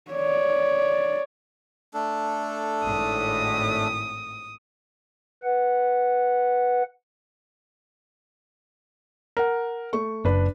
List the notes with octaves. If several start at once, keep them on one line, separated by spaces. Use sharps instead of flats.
C#5 D5
A3 D4 A4
G#1 A2 D#6
B4 F#5
A#4 F#5
A3 C#6
F#1 D4 B4